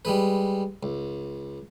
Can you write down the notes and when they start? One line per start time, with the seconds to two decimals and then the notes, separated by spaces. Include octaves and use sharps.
0.05 G3 G#3 B4
0.83 C#2